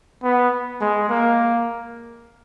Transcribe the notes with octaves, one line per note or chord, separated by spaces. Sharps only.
B3
G#3
A#3